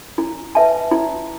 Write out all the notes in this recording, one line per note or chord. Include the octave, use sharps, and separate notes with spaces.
E4
B4 E5 A5
E4